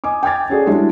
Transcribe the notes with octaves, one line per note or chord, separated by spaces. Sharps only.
D#5 G#5 D6
G5 G#5 D6 G#6 A6
C#4 F#4 G#4 A4 D5
G3 G#3 D4 E4 F#4